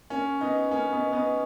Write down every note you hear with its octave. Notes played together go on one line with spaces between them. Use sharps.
A#3 C#4
B3 D#4
A#3 C#4
B3 D#4
B3 D#4